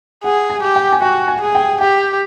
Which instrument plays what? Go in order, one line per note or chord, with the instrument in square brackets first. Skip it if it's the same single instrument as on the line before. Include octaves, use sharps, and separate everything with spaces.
[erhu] G#4 [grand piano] F#5
[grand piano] G#5
[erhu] G4
[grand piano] G5
G#5
[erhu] F#4 [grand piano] G5
[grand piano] G#5
[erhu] G#4
[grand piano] G5
[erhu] G4 [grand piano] G5